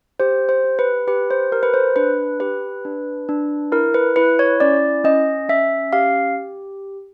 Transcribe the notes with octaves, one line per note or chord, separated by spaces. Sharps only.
G4 C5
C5
G4
B4
G4 B4
C5
G4 A#4
B4
C5
D4 B4
G4 B4
D4
D4
E4 A#4
B4
E4 B4
C#5
C#4 D5
C#4 D#5
C#4 E5
G4 F5